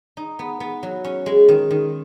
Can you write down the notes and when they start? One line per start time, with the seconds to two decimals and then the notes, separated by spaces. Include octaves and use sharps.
0.17 D#4
0.39 B3
0.60 B3
0.83 F#3
1.04 C#4
1.26 G#3
1.48 D#3
1.71 D#3